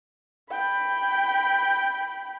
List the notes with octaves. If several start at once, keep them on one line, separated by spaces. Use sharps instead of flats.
G5 B5